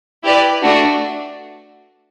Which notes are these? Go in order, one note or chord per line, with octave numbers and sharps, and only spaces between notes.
E4 G4 B4 D5
A3 D4 F#4